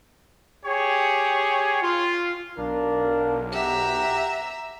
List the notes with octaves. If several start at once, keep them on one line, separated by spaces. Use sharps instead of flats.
G4 G#4 C#5
F4
B1 D4 A#4 F5
G4 E5 F#5 A#5